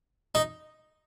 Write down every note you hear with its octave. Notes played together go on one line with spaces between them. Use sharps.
D#4